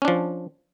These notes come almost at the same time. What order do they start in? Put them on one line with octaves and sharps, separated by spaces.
C#4 D4 F3